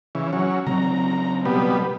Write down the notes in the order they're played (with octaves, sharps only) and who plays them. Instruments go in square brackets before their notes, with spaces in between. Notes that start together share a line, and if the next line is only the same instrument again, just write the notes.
[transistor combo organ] C#3 E3
F#3 C#4
[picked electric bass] C#3 F#3 C4 [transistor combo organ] A#5
[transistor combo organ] B2 G3 B3